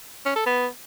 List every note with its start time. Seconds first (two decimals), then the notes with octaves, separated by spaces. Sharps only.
0.25 C#4
0.36 A4
0.46 B3